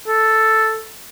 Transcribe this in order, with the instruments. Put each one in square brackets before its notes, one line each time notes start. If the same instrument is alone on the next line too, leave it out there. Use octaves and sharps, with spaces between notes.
[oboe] A4